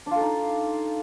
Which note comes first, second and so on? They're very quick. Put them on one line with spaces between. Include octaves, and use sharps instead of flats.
D4 F4 A4 D#4